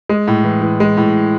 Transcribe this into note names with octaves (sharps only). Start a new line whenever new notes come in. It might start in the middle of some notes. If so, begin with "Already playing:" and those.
G#3
A2
E3
E3
G#3
A2